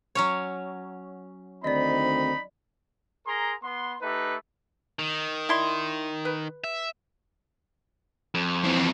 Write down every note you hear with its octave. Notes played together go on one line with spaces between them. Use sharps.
F#3 C#4 C#5
D2 D#3 C4 D#4 D5 D#5 B5
G#4 A#4 A#5 C6
B3 C6
A3 D#4 G4 B4
D#3
E4 D5 C6
B4
E5
F2
E3 C4